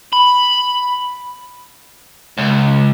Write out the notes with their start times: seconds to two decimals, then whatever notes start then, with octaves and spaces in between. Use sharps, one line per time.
0.13 B5
2.38 C#2